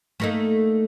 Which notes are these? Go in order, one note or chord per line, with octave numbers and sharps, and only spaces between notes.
A3 A#3 D#4